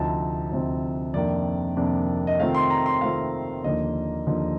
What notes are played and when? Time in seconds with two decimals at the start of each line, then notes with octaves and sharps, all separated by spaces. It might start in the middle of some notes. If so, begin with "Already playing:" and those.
Already playing: D2 C3 F3 C4 D#4 A5
0.52 D2 C3 F3 C4 D#4
1.14 F2 C3 D#3 A#3 D4 D5
1.76 F2 C3 D#3 A#3 D4
2.27 D#5
2.39 C3 D#3 A3 C4 F4 F5
2.55 C6
2.70 A#5
2.86 C6
3.01 C3 D#3 A3 C4 F4 F5
3.64 D#2 D3 F3 A#3 D#4 D#5
4.27 D#2 D3 F3 A#3 D#4